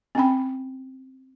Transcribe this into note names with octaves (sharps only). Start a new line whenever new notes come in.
C4 C#4 G5 B5